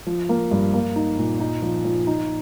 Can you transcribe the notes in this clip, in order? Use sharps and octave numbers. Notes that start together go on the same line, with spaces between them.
F3
A#3
G2
A#3
D#4
A#2
D#4
F3
F3
D#4